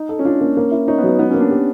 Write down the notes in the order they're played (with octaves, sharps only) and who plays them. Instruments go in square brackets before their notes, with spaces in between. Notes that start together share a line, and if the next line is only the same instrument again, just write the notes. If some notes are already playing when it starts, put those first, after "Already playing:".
Already playing: [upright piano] D#4
[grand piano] A4
[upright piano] C#4
[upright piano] D4 [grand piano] F4
[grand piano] A#3 [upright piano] C#4
[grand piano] A#3
E4
[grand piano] C#4 [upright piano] D#4
[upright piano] B3
[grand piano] F#3
[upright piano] B3
[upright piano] B3 [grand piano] D#4
[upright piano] C#4
[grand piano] A#3
[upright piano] D4
[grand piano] G4